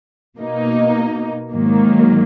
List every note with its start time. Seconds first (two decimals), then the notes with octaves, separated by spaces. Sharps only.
0.37 B2 A#3 D#4
1.52 G#2 D#3 F#3 A#3